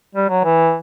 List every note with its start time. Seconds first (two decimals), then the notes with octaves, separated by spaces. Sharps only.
0.15 G3
0.29 F#3
0.44 E3